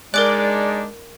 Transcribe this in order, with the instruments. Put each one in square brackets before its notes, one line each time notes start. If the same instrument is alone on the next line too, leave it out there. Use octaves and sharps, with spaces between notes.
[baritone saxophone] G#3 [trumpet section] D4 D#4 [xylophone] A#4 D6 F#6 [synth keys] D5